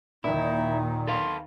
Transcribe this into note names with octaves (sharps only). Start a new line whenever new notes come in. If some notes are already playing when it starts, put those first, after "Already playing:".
D#2 A#2 D#3 D#4 E4
A4 B4 F5 C6